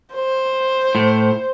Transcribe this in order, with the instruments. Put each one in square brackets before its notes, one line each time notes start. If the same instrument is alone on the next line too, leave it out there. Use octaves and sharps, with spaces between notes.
[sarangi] C5
[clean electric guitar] A2